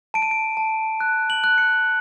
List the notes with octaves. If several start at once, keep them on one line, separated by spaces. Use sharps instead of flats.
A5 D7
D#7
D7
A5
F#6
F#7
F#6
C#7